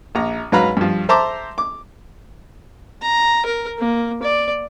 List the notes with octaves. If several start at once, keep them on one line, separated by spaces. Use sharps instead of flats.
A#1 A#5
G#2 F#3 B4 F5 A#5 B5
G2 F3
C5 E5 A5 A#5 C6 D6
D6
A#5
A#4
A#3
D5